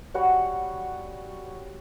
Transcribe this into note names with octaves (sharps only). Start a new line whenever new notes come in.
G3 F#4 C#5 F#5